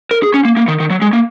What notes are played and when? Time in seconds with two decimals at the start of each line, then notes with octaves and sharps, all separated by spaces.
0.11 A#4
0.23 G#4
0.34 C#4
0.45 A#3
0.57 A#3
0.68 D#3
0.80 D#3
0.90 F#3
1.02 G#3
1.13 A#3